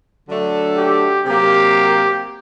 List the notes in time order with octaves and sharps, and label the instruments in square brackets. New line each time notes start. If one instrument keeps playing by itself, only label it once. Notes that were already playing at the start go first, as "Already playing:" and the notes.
[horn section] D3 F#3 A3 D4 A4
[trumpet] G4
[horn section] C3 F#3 A#3 [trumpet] G4